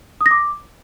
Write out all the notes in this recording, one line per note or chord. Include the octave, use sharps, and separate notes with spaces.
D#6
A#6
D6